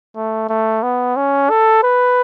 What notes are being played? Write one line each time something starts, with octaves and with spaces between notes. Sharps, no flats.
A3
A3
B3
C#4
A4
B4